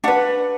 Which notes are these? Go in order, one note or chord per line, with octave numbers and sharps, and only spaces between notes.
D4 B4 F#5